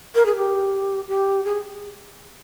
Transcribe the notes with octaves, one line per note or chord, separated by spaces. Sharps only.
A#4
G#4
G4
G4
G#4